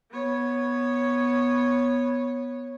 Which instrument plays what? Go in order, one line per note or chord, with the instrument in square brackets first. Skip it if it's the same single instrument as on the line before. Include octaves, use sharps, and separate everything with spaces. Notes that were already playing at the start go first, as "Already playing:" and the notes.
[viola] B3 C#5